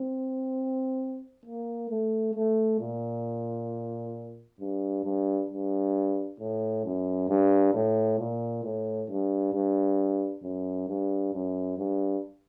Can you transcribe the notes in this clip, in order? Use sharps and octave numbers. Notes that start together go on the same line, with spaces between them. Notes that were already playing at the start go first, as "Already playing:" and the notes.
Already playing: C4
A#3
A3
A3
A#2
G2
G2
G2
A2
F#2
G2
A2
A#2
A2
G2
G2
F#2
G2
F#2
G2